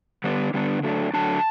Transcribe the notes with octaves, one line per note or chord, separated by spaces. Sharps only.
D3 G3 B3 D4
D3 G3 B3 D4
D3 F#3 A3 D4
D3 F#3 A3 D4 A5